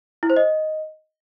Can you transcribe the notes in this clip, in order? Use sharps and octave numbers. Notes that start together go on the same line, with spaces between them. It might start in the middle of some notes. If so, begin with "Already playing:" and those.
E4
C5
D#5